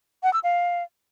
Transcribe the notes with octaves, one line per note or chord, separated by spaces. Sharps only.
F#5
E6
F5